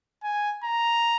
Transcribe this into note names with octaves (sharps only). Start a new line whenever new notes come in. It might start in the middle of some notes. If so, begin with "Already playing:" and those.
G#5
A#5